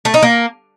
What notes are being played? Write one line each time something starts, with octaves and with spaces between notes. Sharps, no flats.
A3
D#4
A#3